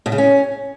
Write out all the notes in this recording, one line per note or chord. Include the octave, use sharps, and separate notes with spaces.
B2
C#3
C#4